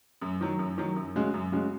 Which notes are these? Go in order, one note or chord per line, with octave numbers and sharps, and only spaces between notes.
F#2
D#3 F#3
F#2
D#3 F#3
F#2
C#3 G#3 F#4
F#2
C#3 G#3 F#4